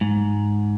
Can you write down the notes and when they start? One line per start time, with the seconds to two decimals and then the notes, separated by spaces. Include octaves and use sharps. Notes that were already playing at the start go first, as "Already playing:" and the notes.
0.01 G#2